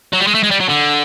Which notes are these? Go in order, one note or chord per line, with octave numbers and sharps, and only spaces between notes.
F#3
G3
G#3
A3
G#3
G3
F#3
D3